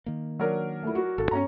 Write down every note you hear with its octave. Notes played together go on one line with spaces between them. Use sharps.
D#3 A#3
F#3 D4 A#4
A3 E4
F#4
G#1 A4
G2 B3 C#4 C#5 A#5